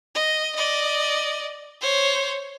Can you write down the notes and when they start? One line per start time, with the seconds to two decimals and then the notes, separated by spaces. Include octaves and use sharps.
0.15 D#5
0.56 D5 D#5
1.82 C5 C#5